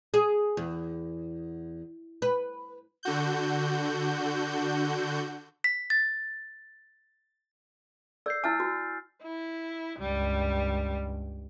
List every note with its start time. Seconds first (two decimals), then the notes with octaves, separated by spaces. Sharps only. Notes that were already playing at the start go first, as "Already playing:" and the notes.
0.14 G#4
0.57 E2
2.22 B4
3.03 D3 F#4 G6
5.64 B6
5.90 A6
8.26 A4 D5 E6 G6 C7
8.44 E4 E5 G#5 E6 F6 A6
8.60 F#4
9.22 E4
9.99 C#2 G2 G3